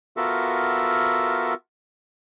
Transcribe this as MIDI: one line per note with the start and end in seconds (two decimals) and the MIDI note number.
0.17 1.54 59
0.17 1.54 65
0.17 1.54 66
0.17 1.54 69
0.17 1.54 70
0.17 1.54 76